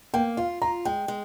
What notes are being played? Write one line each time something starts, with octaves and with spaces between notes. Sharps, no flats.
A#3 G5
F4 F5
F4 A#5
G#3 G5
G#3